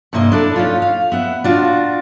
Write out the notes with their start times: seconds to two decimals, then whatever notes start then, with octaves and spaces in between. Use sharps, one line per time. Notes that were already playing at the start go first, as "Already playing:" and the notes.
0.13 G2 C3 A#3 E4 D#5
0.32 D4 E4 A4
0.56 C#4 D#4 F4
0.82 F5
1.12 B3 E5 F#5
1.44 D4 F4 F#4